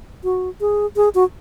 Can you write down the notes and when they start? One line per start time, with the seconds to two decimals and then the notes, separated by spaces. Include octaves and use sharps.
0.24 F#4
0.61 G#4
0.96 G#4
1.15 F#4